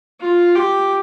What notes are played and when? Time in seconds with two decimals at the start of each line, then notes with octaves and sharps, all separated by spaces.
0.21 F4
0.55 G4